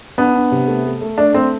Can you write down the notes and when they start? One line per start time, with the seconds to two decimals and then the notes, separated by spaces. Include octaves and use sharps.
0.18 B3 D4
0.35 D4
0.52 C3
0.68 A3
0.85 A3
1.01 A3
1.18 A3 D4
1.34 A3 C4